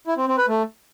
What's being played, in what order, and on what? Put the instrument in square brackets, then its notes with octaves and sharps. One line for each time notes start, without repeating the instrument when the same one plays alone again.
[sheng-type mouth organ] E4
C4
C4
B4
A3